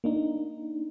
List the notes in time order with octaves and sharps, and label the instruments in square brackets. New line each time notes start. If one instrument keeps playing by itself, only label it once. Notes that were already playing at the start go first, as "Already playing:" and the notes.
[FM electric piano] A#3 D4 D#4